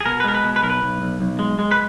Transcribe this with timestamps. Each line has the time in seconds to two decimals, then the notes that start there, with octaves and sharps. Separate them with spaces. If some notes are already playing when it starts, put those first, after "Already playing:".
0.01 G#4
0.06 B2 A#4
0.20 B4
0.24 G#3 A#4
0.35 B4
0.44 B2
0.56 B4
0.63 B1 A#4
0.70 B4
0.82 B1
1.02 B1
1.20 B1
1.39 G#3
1.59 G#3
1.71 B4